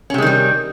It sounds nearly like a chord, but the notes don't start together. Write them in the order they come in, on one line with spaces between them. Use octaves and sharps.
C#4 C3 G#3 D#3 G3